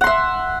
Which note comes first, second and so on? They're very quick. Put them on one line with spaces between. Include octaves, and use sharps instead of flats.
F#5 C6 E5